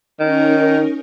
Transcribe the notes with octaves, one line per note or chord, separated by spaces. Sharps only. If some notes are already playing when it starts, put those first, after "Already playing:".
D#3 C#4 D#4 A#4